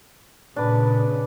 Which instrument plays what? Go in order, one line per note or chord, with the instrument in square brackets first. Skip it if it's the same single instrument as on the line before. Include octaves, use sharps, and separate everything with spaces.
[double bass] A#2 C#3 [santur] D4 B4